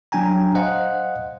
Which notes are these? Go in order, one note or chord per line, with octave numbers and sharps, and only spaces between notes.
F#3 D4 G5 G#5 A#5
C5 D#5 F5 F#5